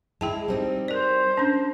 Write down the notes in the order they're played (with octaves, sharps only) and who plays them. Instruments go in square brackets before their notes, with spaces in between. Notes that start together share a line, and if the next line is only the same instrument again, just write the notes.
[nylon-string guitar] G#3 E4 [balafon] G#4 G5 A5
[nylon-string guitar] G3 C4 D#4
[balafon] A#4 D5 [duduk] C5
[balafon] C#4 D4